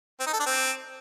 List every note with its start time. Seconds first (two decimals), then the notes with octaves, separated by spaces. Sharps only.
0.20 C4
0.26 D#4
0.33 A4
0.40 D4
0.46 C4